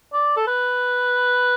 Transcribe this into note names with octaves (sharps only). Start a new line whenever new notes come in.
D5
A4
B4